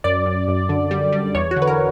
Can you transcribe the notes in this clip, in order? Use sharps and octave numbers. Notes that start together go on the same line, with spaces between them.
F#2 D5
F#2
F#2
D3
G3
G3
E2 C#5
F#4
D3
B4
A#4